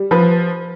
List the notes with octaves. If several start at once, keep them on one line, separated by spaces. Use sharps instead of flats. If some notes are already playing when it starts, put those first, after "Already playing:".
Already playing: G3
F3 B4